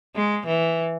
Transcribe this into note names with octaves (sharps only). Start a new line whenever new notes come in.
G#3
E3